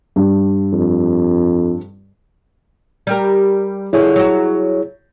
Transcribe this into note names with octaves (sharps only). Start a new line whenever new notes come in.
G2
F2
G3 G4 A#4
D3 F3 E4 G#4 C#5
F#3 F#4